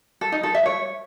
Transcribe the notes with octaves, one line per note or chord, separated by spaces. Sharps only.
A4
D#4
A4
E5
C#5